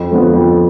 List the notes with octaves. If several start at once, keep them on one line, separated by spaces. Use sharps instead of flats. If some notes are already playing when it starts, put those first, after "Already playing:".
Already playing: F2
D3 F3 B3
F2